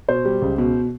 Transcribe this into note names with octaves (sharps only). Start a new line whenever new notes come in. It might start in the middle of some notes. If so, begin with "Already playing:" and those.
B2 C5
G3
C#2
B2